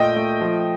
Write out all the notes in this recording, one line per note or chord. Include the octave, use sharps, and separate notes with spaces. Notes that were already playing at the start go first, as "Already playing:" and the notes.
Already playing: A#2 A3 D#5 G5
A3
F3